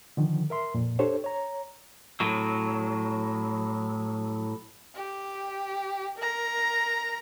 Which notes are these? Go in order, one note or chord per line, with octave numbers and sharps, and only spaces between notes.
D3 D#3 F3
A#4 E5 C6
F2 A#2
D4 G4 A4 C5 C#5
C#5 A#5
A2 F#3
G4
A#4 A#5